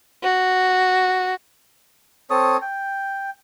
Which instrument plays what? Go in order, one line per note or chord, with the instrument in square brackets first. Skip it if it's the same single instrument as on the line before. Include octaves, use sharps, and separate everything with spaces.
[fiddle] F#4
[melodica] C4 A4 C#5 D#6
G5